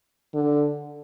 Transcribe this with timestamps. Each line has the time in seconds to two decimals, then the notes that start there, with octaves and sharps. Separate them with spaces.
0.34 D3